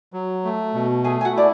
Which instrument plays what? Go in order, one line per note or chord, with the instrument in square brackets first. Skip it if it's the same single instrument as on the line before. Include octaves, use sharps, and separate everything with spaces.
[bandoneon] F#3
A3
B2
[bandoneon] A3 [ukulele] G#4 G#5
[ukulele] G#5
F#4 F#5
[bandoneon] E4 [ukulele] D5